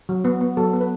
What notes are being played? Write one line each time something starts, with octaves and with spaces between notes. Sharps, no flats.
F#3
B3
B3
F#3 A4
B3
B4